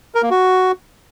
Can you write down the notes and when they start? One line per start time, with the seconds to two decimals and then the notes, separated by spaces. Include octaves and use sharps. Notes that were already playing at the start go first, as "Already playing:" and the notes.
0.15 A#4
0.23 A#3
0.30 F#4